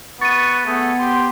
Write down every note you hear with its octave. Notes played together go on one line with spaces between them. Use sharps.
B3 C#6 A6 C#7 D#7
A3 B3 G#4
G4 C6